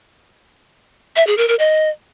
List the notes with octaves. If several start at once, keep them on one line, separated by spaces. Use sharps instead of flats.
E5
G#4
A#4
A#4
D#5